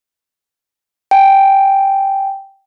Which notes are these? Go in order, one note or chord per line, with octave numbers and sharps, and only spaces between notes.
G5 G#5